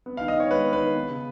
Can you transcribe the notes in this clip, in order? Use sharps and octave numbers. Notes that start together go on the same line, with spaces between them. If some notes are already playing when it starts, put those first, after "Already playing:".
B3
D#3 F5
D#5
D#3 C#5
G#3 B4
B3
B4
D#3
B3
C#3